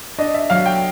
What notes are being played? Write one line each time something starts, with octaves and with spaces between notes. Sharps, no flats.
D4 D#5
E5
F#3 F5
G5